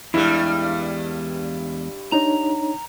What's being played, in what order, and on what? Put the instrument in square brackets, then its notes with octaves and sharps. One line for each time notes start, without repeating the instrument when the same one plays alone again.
[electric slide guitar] E2 G#3 [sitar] G2 G3 [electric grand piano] E4
[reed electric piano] D4 D#4 C#5 [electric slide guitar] A#5